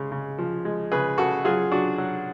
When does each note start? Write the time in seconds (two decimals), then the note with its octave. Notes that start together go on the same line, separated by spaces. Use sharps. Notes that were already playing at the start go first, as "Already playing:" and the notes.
Already playing: C#3 G#3
0.12 C#3
0.38 F3
0.65 G#3
0.92 C#3 G#4 B4
1.18 C#3 F#4 A4
1.45 F#3 F4 G#4
1.71 F#3 D4 F#4
1.98 F#3